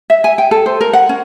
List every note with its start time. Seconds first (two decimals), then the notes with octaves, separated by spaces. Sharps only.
0.10 E5
0.24 G#5
0.38 G5
0.51 A4
0.66 C5
0.81 A#4
0.93 F#5
1.09 C#4